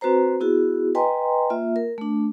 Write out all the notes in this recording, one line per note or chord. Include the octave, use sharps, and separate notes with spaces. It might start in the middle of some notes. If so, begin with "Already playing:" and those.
C4 F#4 B4 C5 A#5
B3 E4 F#4 G#4
B4 D#5 G5 G#5 A#5 C6
A#3 F4 E5
A#4
A3 D4